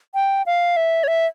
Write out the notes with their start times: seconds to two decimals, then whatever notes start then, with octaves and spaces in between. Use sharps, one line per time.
0.15 G5
0.46 F5
0.77 E5
1.04 C#5
1.08 E5